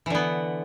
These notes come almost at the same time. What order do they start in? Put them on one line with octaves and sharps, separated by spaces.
E3 D3 B3